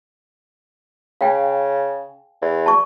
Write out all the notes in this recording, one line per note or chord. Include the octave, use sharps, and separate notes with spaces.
C#3 F5 G5 G#5
E2
A5 C#6